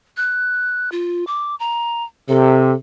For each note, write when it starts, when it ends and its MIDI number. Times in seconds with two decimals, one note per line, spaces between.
0.17 0.90 90
0.92 1.25 65
1.27 1.55 86
1.60 2.04 82
2.29 2.72 48
2.29 2.74 69